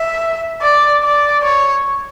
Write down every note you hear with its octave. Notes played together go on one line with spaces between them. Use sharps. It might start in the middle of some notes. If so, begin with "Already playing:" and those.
Already playing: E5
D5
D5
C#5